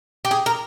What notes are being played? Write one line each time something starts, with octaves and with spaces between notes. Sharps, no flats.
G4
G#4
A#4